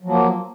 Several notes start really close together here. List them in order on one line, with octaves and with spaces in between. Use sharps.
F#3 F3 A#3